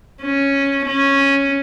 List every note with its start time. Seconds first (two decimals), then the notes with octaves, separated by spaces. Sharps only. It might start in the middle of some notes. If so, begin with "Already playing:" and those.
0.22 C#4
0.86 C#4